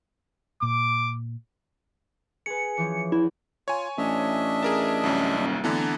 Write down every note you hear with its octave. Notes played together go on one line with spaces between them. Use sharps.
A#2 D6
G#4 B4 C#7
E3 F3 C#4
E2 E4
F4 C#5 G#5
A1 D4 D#5 E5
G#4 A#4 A5
C2 F#2 C#4
D#1
D1 D3 E3 B3 A5 A#5